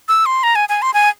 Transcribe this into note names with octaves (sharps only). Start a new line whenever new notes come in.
E6
C6
A#5
G#5
G#5
C6
G#5